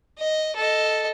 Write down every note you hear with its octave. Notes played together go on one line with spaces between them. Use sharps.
D#5
A4 D#5